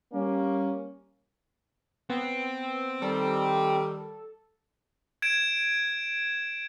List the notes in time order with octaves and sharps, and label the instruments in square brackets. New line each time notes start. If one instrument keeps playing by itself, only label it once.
[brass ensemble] G3 A#3 C#4
[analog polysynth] B3 [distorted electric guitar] C4
[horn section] D#3 G3 [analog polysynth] A4
[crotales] G#6 D7 E7